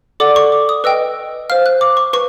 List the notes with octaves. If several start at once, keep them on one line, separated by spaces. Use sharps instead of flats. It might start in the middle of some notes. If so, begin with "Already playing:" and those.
A4 D5 F#5 D6
C#6
D6
D#6
B4 D#5 G5 E6
C5 F5 F6
F#6
D6
C#6
B4 C#6